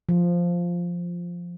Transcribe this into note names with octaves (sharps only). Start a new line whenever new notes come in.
F3